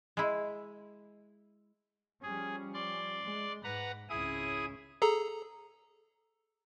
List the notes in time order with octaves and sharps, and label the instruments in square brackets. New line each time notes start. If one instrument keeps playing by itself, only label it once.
[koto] G#3 E4
[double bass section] F3 G3 C#4 [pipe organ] G#4
[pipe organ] D5 C6
[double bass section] G#3
[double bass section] G#2 [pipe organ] B4 F#5 A#5
[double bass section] G#1 C#2 C#4 [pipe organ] E4 G#4 D#6
[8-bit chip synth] G#4 A4 A#5